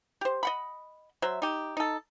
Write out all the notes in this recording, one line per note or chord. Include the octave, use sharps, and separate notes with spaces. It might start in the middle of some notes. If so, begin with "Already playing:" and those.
G4 C5
D#5 F#5 B5
F#3 C5 E5
D#4 G4
D#4 A4